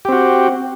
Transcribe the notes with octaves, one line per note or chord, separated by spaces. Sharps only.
C4 F#4 G4